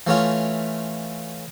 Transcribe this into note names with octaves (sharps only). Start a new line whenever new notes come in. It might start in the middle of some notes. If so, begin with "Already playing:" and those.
E3 A3 C#4 F4